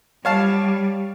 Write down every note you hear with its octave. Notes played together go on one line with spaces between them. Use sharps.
G3 C#5 F5 A5